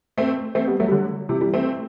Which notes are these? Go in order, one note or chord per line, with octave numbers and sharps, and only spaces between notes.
A3 C4
A3 C4
G3 B3
F#3 A3
G3
D3 F#3
C3 E3
E3 G3
A3 C4